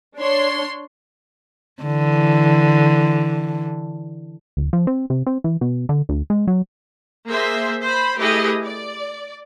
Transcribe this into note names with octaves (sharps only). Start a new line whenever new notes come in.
D4 C#5 C6
D3 E3
D1
F3
C4
C3
C4
E3
B2
D3
D2
G#3
F#3
A#3 G#4 C5 E5
C5 B5
A3 E4 G4 G#4 B4 D#5
D5